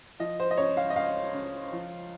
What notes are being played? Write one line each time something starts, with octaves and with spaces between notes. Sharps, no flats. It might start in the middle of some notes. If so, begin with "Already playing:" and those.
F3 D#5
C5
D#5
C#2 C#5
F5
D#5
C#2 F5
C#3
F3